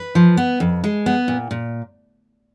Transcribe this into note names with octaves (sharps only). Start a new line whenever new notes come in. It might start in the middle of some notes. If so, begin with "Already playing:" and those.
Already playing: B4
F3
B3
F2
G#3
B3
A#2
A#2